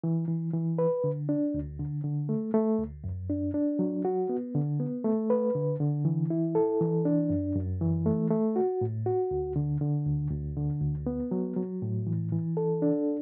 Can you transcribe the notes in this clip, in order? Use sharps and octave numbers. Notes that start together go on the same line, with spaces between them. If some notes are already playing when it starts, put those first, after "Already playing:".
E3
E3
E3
B4
D3
D4
D2
D3
D3
A3
A3
D2
F#2
D4
D4
F#3
F#4
B3
D3
B3
A3
B4
D3
D3
E3
E4
A4
E3
D4
F#2
F#2
E3
A3
A3
F#4
A2
F#4
D2
D3
D3
D2
D2
D3
D2
B3
F#3
F#3
A2
E3
E3
A4
D4